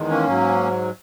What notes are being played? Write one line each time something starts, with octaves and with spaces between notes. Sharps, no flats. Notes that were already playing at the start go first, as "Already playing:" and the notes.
Already playing: E2 D#3 G#3
A#3 C#4
G#2 F#3